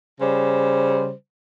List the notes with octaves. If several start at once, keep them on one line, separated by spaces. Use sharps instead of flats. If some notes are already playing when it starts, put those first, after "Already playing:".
C#3 G3 C5